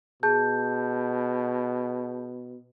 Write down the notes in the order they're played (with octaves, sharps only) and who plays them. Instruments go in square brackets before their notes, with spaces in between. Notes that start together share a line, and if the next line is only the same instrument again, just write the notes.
[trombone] B2 [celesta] G#4 A5 G6